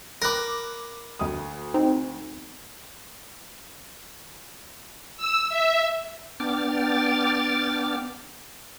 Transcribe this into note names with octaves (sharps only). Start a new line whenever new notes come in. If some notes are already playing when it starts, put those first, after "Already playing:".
A#4 B4 D6 F#6 A#6
D2 D#6
C4 D#4
E6
E5
B3 D4 G5 D6 F6 A6